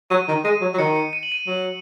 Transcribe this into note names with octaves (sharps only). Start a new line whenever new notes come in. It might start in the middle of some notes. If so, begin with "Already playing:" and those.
F#3 D#7
D#3
G#3 D#7
F#3
F#3
D#3 C#7
C#7
D#7
F#7
D#7
F#3 F#7